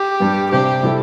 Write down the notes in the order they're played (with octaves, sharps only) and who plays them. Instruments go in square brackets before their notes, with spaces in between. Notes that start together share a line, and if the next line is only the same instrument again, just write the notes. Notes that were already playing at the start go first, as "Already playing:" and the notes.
Already playing: [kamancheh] G4
[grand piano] G2 G3 D4
[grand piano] C3 G3 D4 C5 [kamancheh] G4
[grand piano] C3 G3 E4 A4